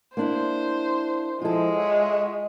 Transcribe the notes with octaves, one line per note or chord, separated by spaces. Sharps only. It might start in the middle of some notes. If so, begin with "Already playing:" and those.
A#3 D4 E4 C5
F3 G#3 E4 F4 A4
C#5 E5 F#5